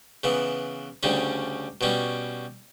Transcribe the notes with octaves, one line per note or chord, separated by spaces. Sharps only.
C#3 E3 B3
D2 C#3 G3 C#4
B2 G3 C#4